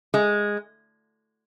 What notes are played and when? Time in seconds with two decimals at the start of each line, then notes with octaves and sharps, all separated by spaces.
0.14 G#3